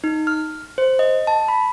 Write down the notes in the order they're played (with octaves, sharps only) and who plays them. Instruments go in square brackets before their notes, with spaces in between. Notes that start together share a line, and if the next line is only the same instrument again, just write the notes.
[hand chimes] D#4
F6
C5
D#5
A5
B5